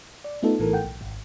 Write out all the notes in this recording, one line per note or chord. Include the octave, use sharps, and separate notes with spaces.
D5
A3 B3 D#4 F4 A4
A#1 A2 E3 A4 A#4
F#5 G5
B1
G#1